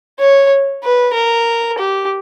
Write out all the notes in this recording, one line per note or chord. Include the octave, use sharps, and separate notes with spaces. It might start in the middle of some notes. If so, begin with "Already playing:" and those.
C#5
B4
A#4
G4